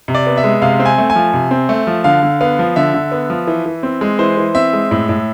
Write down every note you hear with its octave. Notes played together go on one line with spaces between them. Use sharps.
C3
D5
B3
E5
G#3
C3 F5
C4
G#5
A3
G#5
F3
C3
C4
A3
F3
D3 F5
D3
B3 F5
F3
D3 E5
D3
B3
F3
E3
E3
C4
G#3
E3 C5
E3
C4 E5
G#3
A2
A2